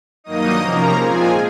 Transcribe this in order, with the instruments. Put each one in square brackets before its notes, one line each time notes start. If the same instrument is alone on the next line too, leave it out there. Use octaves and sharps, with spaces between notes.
[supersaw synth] G2 D#3 F#3 A#3 D#4 D#5 D#6
C3 F3 A#3 C#4 A#4 A#5
A#2 F3 G#3 C4 F4 G#4 G#5